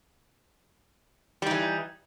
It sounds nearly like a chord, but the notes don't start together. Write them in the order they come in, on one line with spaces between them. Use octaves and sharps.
G3 D#4 E3